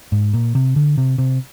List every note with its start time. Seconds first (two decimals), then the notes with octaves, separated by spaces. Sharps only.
0.12 G#2
0.33 A#2
0.55 C3
0.76 D3
0.98 C3
1.18 C3